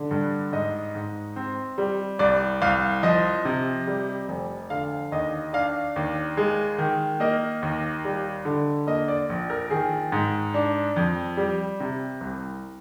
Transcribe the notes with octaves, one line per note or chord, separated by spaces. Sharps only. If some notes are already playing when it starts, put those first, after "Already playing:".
Already playing: D3
G2
G#2 D#5
G#2
C4
G3
C2 D5
C2 F5
F3 D#5
C3
G3
F1
D3 F5
D#2 D#5
D4 F5
D#2
G#3
D#3
A#3 D#5
D#2
G3
D3
A#3 D#5
D5
A#1
A#4
D#3 G#4
G#2
D4
F2
G3
C3
C2